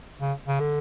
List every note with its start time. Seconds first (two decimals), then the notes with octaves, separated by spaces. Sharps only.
0.21 C#3
0.47 C#3
0.60 D3